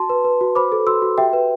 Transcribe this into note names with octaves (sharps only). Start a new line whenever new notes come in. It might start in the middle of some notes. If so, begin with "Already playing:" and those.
Already playing: F#4 A5 C6
B4
B4
F#4
C5 B5 D6
A4
F#4 C6 E6
F#4
G4 E5 G5
B4